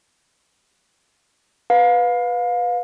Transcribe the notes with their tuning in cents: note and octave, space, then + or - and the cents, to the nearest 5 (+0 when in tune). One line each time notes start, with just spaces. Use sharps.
B4 +0 F5 +30